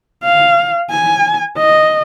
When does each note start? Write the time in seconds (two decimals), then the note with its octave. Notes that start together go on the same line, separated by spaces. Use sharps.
0.23 F5
0.90 G#5
1.58 D#5